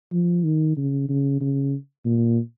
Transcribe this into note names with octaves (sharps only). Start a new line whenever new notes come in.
F3
D#3
C#3
C#3
C#3
A#2